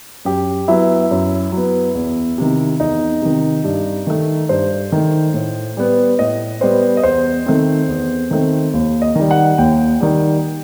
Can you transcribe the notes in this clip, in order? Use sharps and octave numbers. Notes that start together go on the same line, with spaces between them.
F#2 G4
F#3 B3 E4
F#2
F#3 B3
E2
C3 D#3
E2 D#4
C3 D#3
G2
D#3 A3
G2 C5
D#3 A3
A2
G3 B3
A2 D#5
G3 B3 C5
D#5
E2 C5
D#3 A3 C4
E2
D#3 A3 C4
D#2
D#5
D#3 G3
F#5
D#2 G5
D#3 G3